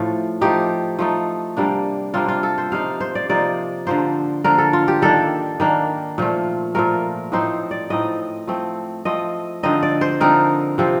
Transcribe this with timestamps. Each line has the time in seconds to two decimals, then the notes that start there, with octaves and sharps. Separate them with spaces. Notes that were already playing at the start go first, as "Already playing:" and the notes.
Already playing: A2 F3 A3
0.41 F3 A3 D#4 G4
0.99 F3 A3 D#4
1.57 C3 G3 A#3 D4
2.14 C3 G3 A#3 D4 F4
2.28 F4
2.43 A4
2.58 C5
2.72 C3 F3 A#3 D#4 F5
3.00 C5
3.15 D5
3.29 C3 F3 A#3 D#4 D5
3.87 D3 F3 A#3 C5
4.44 D3 F3 A#3 A#4
4.58 A4
4.73 F4
4.88 G4
5.02 D#3 A#3 D4 A4
5.60 D#3 A#3 D4
6.18 A#2 F3 A3
6.75 A#2 F3 A3 A#4
7.32 A2 F3 C4 D#4 C5
7.71 D5
7.90 A2 F3 C4 D#4 D#5
8.47 F3 A3 C4
9.05 F3 A3 C4 D#5
9.63 D3 F3 C4 D#4 D#5
9.82 D5
10.01 C5
10.20 D3 F3 C4 D#4 A#4
10.78 C3 F3 C4